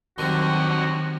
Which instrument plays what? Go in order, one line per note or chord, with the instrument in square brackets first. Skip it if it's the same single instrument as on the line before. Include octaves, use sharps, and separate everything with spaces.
[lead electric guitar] D3 [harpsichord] D#3 G3 A#4 [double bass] F#3 C4 [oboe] F#4